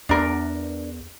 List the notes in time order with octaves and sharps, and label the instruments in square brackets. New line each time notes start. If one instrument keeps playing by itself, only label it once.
[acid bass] E2 [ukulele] D4 A#4